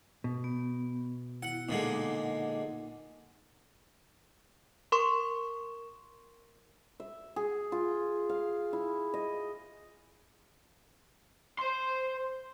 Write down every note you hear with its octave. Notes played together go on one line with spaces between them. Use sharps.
B2
B3
E4 F#5
A#2 D3 G#3 D#4 F#5
A#4 C6 C#6
E5
G#4
F4
F5
E4
D#5
C5 C6